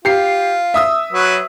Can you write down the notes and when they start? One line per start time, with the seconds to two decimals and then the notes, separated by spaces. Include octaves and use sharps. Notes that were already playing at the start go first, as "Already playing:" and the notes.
0.05 F4 G4 C7
0.74 E5 D#6 E6
1.13 F#3 B4